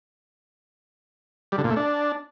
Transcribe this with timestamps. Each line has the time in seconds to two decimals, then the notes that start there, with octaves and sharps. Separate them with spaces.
1.52 G3
1.58 D3
1.64 A#2
1.70 A3
1.76 D4